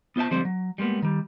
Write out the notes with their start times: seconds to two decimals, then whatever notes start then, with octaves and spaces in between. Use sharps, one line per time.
0.16 B3 F4 C5 E5 A5
0.31 D3 F3 G3 G#3 C4 C5
0.45 F#3
0.78 G3 G#3 A#3 B3
1.02 D#3 G3